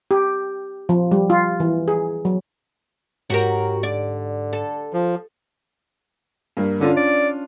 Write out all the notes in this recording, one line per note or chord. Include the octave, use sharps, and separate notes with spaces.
G4
F3
G3
F4
E3
G#4
F#3
G#2 F#3 F#4 G4 A#4
D3 D5
A4
F3
G2 A#3
D3 C#4 D4 F4
D5